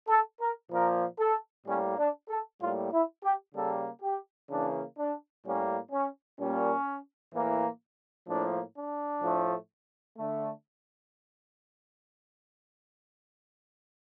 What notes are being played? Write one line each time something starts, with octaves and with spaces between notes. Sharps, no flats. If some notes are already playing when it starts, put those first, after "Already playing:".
A4
A#4
A#2 F3 A#3 A#4
A4
A2 G3 A#3 C#4
D4
A4
A2 G3 A#3 F4
E4
G4
C#3 G3 A#3 A4
G4
C#3 E3 A#3 D4
D4
A2 G3 A#3 C#4
C#4
A#2 G3 A#3 C#4
A2 E3 A#3
A2 F3 A#3 D4
D4
A2 F3 A3
D3 A3